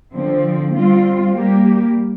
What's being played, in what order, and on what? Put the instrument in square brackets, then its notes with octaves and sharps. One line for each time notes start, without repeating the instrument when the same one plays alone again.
[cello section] D3 F3 C4
G3 C4 F4
G3 A#3 G4